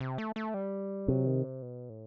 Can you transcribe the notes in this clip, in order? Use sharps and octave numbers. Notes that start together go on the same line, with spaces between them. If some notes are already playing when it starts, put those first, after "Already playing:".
C3
A3
A3
G3
C3 F#3
D#3
C3
B2
A2